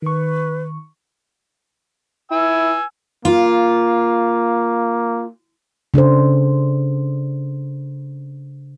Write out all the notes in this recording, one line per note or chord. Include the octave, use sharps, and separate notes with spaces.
D#3 B4 C#6
E4 G#5 E6
A#3 F4
C#3 D4 A4 C5